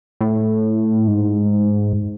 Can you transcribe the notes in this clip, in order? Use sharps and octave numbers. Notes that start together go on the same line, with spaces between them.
A2
G#2